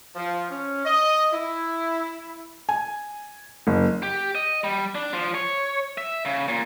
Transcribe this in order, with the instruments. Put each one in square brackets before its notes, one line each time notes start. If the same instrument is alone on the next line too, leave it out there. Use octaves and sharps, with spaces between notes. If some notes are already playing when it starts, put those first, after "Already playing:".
[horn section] F3
C#4
D#5
E4
[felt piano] G#5
F#1
[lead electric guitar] G4
D#5
G3
D4
F3
C#5
E5
C#3
A#2